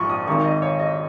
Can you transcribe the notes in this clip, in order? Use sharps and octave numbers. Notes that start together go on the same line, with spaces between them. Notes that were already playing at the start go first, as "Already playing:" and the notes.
Already playing: A#1 G#2 F3 C#6
D#6
G#1 G#2 D#3 C#6
D#5
C#5
D#5